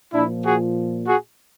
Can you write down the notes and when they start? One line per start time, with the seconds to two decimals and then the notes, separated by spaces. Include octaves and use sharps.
0.13 A#2 F3 D4 E4
0.45 F#4 G#4
1.06 F#4 G#4